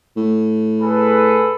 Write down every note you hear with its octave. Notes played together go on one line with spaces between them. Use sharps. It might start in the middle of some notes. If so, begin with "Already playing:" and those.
A2
G#4 A4 B4